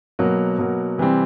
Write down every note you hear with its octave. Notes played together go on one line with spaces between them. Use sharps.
B2 F#3 A#3
B2 F#3 A#3
C3 E3 G3 C4